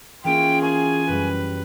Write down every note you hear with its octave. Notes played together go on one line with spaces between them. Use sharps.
E3 A#3 C#4 F4 G#4 G5
A#4 G5 G#5 C#6
F#2 G3 B4 C7